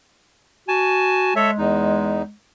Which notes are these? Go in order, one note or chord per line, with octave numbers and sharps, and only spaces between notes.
F#4 G#5 A5
G#3 A4 C#5 E5
E2 D#4